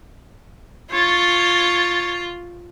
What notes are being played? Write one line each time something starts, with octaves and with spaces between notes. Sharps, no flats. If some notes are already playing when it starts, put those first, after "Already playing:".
F4 C#5 A6